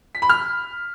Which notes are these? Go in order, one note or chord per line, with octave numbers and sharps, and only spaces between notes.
B6
B5
F6